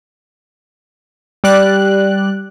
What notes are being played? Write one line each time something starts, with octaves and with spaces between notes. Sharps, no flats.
G3 D5 F#6